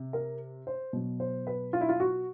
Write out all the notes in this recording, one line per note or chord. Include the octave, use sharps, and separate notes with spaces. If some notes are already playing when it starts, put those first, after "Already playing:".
Already playing: C3
A#4
C5
B2 F#3
C5
B4
F4
E4
F4
F#4